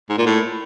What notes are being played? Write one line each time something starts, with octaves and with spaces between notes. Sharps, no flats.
G#2
A#2
A2